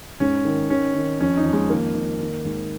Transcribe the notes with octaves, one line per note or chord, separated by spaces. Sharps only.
G#2 C#4
D#3
D#3 C#4
D#3
F2 C#4
D#4
F2
G#3
D#3 A#3
D#3
D#3
G#2